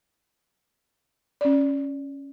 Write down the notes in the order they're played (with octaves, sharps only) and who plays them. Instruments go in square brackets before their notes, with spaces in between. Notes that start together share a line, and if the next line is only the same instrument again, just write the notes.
[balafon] C#4 D5